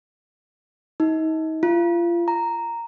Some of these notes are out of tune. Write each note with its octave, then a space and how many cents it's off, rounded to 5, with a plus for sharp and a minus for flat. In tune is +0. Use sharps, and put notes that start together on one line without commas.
D#4 +35
F4 -30
A#5 -5